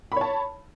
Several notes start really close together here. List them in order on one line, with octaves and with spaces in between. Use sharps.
B5 C#5 A5